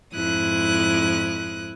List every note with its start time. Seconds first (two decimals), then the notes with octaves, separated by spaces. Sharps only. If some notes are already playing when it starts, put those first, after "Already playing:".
0.15 F2 G#2 E4 D#6 F#6